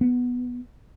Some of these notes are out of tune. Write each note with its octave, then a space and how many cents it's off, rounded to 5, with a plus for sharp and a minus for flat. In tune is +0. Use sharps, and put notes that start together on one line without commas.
B3 +0